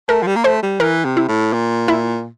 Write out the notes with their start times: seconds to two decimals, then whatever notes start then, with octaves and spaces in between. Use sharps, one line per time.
0.08 A3 A#4
0.22 F3
0.27 G3
0.36 A#3
0.44 A3 C5
0.63 G3
0.80 E3 A#4
1.05 C3
1.17 E4
1.28 A2
1.53 A#2
1.88 E4